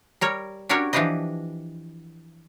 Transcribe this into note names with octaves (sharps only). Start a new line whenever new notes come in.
G3 A#4 C#5
C#4 D4 F#4 G4 A#4 C#5
E3 F3 D4 G4 B4 D#5